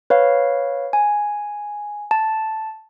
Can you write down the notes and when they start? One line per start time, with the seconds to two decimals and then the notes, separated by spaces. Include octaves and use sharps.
0.10 B4 C#5 F5
0.93 G#5
2.11 A5